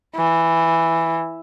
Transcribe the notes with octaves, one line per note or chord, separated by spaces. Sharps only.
E3